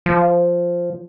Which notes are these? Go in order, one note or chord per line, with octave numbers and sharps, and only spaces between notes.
F3